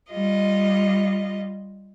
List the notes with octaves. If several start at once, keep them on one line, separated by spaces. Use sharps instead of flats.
G3 F4 D#5